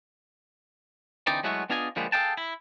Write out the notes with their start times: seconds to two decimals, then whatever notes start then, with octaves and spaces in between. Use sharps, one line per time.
1.27 D3 E3 C4 D#4 D5
1.43 F#3 G#3 A3 B3 E4 F#4
1.70 B3 D4 F4 G#4 D#5 G#5
1.96 D3 F3 G3 G#3 A#3 B3
2.12 G#4 A4 D#5 F5 G5 A5
2.37 E4